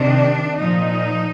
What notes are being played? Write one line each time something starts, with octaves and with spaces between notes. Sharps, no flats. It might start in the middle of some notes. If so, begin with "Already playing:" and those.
Already playing: C3 D#3 D4
A#2 F3 D#4